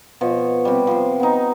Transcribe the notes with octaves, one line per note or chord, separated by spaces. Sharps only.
B2 F3 C#5
C3 G3
F3 C5
B3 D#4